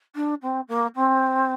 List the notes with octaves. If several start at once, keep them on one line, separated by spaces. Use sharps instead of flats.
D4
C4
A#3
C4